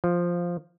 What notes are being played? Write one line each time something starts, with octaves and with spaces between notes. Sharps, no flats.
F3